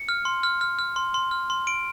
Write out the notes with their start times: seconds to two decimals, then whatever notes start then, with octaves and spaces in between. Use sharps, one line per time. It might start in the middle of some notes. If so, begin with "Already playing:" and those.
Already playing: C#7
0.09 F6
0.25 C6
0.43 F6
0.61 F6
0.79 F6
0.96 C6
1.14 C6
1.31 F6
1.50 C6
1.67 C6 D7